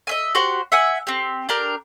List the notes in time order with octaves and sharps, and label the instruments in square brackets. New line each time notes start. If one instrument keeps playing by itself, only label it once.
[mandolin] D#5 E5 G#5
F#4 G4 C5 F#5
E5 F#5 G#5
C4 G4
D4 G4 A#4